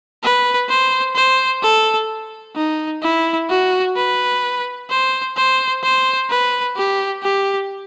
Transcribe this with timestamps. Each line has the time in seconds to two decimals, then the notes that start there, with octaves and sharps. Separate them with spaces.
0.23 B4
0.69 C5
1.16 C5
1.63 A4
2.56 D#4
3.02 E4
3.49 F#4
3.96 B4
4.90 C5
5.37 C5
5.83 C5
6.30 B4
6.76 G4
7.23 G4